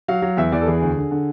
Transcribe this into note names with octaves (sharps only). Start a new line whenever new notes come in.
F#3 F5
F#3
E2 E5
E2 D5
A4
E3 G#4
D2
D3
D3